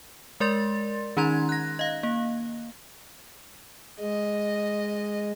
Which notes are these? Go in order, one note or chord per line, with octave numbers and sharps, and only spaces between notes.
G#3 A#4 D5 C6 A6
D#3 C#4 D#4 A#5 C6 G#6
F#6 A#6
D#5 F5
A#3
G#3 D#5